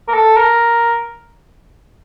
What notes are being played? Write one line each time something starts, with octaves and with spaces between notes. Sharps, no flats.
A#4
A4
A#4